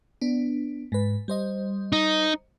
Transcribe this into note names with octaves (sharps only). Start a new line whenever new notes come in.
B3 D4
G#2 B4
G3 C5 D#5
D#4